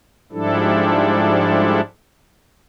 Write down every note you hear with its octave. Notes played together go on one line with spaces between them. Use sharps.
G#2 F3 G3 D4 E4 A4